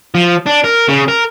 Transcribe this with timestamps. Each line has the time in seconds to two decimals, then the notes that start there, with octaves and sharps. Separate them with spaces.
0.15 F3
0.46 D4
0.64 A#4
0.88 C#3
1.08 A#4